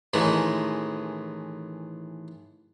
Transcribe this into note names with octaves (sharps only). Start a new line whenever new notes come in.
A1 D#3 E3 G#3 A3